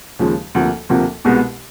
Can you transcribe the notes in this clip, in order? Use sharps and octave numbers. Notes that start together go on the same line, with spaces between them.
D#2 C#3 F3 G#3
D2 C3 F3 A#3
D2 C3 F3 A#3
C2 B2 G#3 B3